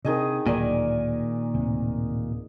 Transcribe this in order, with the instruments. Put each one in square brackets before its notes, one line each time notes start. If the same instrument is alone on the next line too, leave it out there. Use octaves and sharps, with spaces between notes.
[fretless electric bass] C3 [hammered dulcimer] D#3 G#4 D#5
[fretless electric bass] D1 [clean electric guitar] A#2 D#3 [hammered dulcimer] D5 G#5
[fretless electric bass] D1 C3